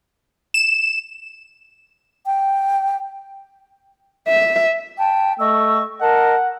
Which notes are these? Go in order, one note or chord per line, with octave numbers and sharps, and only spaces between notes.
E7
G5
E5
G5 A5
A3 D#5 C#6 E6
A#4 D#5 F#5 A5